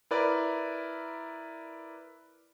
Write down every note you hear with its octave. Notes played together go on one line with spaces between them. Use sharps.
E4 A#4 B4 D5